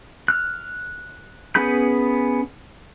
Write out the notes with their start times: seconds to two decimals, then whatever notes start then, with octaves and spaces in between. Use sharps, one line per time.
0.28 F6 F#6
1.55 B3 C#4 G#4 B5 G6